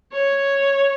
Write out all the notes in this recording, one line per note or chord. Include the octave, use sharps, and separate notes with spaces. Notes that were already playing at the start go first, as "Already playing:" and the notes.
C#5